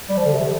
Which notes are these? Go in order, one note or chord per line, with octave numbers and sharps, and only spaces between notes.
G3
F3
D3
C3